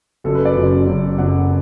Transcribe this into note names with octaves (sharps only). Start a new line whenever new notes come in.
F#1 F#2 F#3 A4
B4
D5
F#1 F#2 F#3
F#1 F#2 F#3
F#1 F#2 F#3 F#5